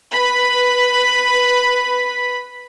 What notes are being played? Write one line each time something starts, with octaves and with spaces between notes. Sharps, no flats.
B4 B5